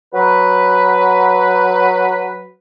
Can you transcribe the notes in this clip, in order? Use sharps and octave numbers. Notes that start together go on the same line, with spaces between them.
F#3 B4